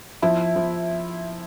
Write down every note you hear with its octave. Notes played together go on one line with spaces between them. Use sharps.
F3 E4
F3